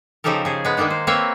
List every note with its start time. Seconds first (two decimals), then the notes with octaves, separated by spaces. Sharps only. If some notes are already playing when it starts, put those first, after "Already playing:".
0.24 C#3 F3 D#4 G4 A4 A#4
0.45 C#3 G#4
0.65 G#3 B3
0.77 D#3 G#3 A#3 D4 D#4
0.90 C5
1.07 A#3 C4 B4 C#5 E5